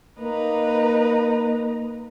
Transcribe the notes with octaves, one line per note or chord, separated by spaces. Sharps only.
A#3 D#4 B4 A#5